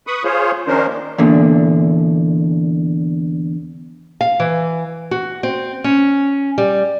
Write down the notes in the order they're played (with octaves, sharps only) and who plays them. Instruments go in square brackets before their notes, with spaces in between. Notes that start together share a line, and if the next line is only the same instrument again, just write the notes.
[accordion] B4 B5 C#6 D#6
F4 G#4 C5 C#5
D#3 F3 C#4 D4 A#4 C5
A#3
[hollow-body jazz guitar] E2 A#2 D3
[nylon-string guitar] F5
E3
F#4
C4
C#4
G3